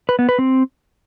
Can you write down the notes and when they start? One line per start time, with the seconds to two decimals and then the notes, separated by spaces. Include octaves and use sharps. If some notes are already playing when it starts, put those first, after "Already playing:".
0.09 B4
0.19 B3
0.29 B4
0.39 C4